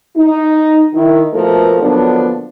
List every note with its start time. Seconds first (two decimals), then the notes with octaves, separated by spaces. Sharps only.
0.17 D#4
0.94 D#3 E4
1.33 B2 F3 A3 A#3 A4 A#4
1.81 D3 F3 F#3 A#3 B3 D4